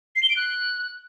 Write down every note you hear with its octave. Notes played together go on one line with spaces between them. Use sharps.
C7
G7
D7
F#6